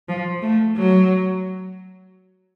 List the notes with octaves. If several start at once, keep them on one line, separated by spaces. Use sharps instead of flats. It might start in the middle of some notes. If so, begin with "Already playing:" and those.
F3
A3
F#3